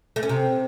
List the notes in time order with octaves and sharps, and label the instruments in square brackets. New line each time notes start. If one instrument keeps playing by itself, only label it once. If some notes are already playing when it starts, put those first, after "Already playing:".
[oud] A3
C#4
C3